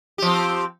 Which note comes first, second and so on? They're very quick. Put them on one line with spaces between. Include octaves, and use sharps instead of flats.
G4 F3 C4